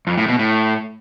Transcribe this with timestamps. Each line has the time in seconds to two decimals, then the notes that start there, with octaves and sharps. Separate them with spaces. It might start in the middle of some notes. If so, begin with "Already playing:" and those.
0.07 F2
0.18 A2
0.28 B2
0.39 A2